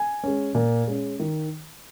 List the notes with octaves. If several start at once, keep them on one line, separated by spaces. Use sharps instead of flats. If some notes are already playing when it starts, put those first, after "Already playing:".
Already playing: G#5
G#3 C#4
A#2
G#3 C#4
D#3